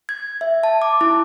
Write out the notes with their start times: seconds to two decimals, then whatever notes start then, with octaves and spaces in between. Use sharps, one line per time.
0.09 G#6
0.41 E5
0.63 A5
0.82 D6
1.01 E4